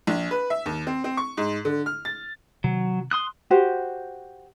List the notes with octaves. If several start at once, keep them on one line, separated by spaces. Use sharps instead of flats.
A#1
B4
E5
D#2
C4
C4
C#6
G#2
D3
F6
A6
C3 D#3 F#3
C6 D#6 F#6
F#4 G4 C5